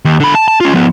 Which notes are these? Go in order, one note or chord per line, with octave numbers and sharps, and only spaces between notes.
D#2
D3 B5
A5
A5
C#4 F4
F3 B3